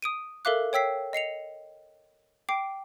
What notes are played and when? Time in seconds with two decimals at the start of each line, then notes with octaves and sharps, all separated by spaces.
0.02 D#6 D7 D#7
0.45 A4 A#4 E5 F5 D6 F#6
0.73 C#5 G5 E6 B6 C7
1.13 D#5 C7 C#7 F7
2.49 G5 D6 C7 D7